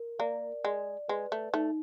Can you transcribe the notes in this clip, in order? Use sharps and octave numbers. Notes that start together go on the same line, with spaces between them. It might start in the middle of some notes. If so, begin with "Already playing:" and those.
Already playing: A#4
A#3 D5
G#3 D5
G#3 B4
A3
A3 D#4